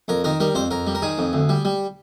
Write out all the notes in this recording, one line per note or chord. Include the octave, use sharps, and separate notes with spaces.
F2 A#4
D#3 A#4
G3 A#4
F2 C5
F2 A#4
G3
A#4
D#3 G#4
F2
D2
G3
G3